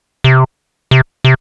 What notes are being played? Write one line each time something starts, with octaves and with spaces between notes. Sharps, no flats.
C3
C3
C3